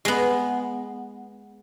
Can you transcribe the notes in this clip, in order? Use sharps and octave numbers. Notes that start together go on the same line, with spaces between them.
G#3 B3